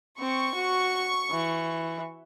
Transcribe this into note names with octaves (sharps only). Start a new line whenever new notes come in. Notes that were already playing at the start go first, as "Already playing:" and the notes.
C4 C#6
F#4
E3